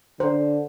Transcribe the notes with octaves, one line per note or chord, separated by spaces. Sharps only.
D3 C5